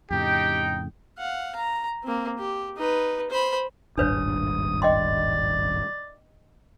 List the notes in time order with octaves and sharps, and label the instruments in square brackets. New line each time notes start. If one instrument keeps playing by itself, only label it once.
[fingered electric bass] F2 A2 C#3 [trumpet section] D#4 G5 [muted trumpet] G4
[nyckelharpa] F5 F#5
A#5
A#3 C4
G4
D#4 B4
C5 B5
[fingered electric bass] D#1 G#1 G2 [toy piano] D4 B4 C#5 [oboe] D#6
[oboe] D5 [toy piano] D#5 G5 C6